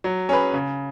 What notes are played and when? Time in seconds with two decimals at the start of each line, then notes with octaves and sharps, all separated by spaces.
0.04 F#3
0.29 C#4 G#4 B4
0.53 C#3